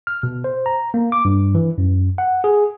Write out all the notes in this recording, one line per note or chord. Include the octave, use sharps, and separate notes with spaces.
F6
B2
C5
A#5
A#3
D6
G2
E3
F#2
F#5
G#4